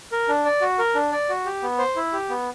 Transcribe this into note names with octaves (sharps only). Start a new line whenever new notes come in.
A#4
D4
D5
F#4
A#4
D4
D5
F#4
G4
B3
C5
E4
G4
B3